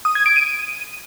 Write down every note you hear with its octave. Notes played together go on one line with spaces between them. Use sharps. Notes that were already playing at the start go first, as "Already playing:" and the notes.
D#6
G#6
D7
D#7